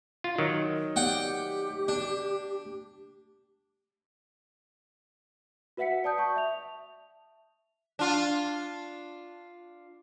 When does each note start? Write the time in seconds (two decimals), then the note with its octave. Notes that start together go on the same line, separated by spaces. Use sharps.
0.24 F4
0.38 D#3 F#3
0.96 G4 D5 F#5 G5
1.88 D4
5.77 F#4 B4 E5 F#5 B6 C#7
6.04 D5 A5 D#6 G6
6.18 A5 C#6
6.36 E5 F7
7.99 D4 F4